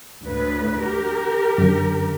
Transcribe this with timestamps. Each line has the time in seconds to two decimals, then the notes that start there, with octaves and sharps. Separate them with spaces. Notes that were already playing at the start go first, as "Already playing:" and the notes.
0.24 D2 A2 B4
0.82 G4 A#4
1.58 F#2 D3